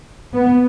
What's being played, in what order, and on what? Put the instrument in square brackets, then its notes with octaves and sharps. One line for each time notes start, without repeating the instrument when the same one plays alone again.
[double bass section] B3